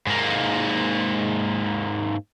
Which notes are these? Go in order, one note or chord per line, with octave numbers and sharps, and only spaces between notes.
G#2 A#3